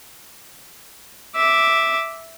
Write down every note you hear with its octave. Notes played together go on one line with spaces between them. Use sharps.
E5 D6